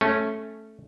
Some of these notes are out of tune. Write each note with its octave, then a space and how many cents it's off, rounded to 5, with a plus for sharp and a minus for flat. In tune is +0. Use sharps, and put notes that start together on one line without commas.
A3 -5 C#4 -10